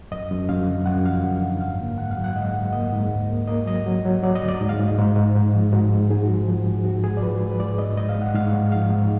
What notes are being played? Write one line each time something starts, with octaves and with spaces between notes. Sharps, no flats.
F#2 D#5
F#2
F#2 F5
D3
F#2 F#5
F3 F5
F#2
D3
G#2 F5
A#3
G#2 F#5
F5
F#3
F#5
G#2 D#5
G#2
A#3 D#5
G#2
D2
A#3
A#3 D#5
F#3 D#5
F#3
F#3
F#3 D5
D#5
D2
D5
G#2
F5
G#2
D#5
G#2
G#2
G#2
F3
G#2 F#4
G#3
G#2 G#4
F#4
F3 G#4
F3
G#2
G#2 F#4
G#2 G#4
D5
F3 B4
G#2
B4
G#2 D5
G#2 D#5
G#2 D#5
F5
G#3
F#5
G#2 F5
G#2
F3 F5
G#2